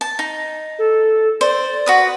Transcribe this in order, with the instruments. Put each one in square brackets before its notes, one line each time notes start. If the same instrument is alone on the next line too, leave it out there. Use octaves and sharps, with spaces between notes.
[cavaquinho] A5
D#4
[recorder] A4
[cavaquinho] C5 [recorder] D5
[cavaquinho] F#4 B4 D#6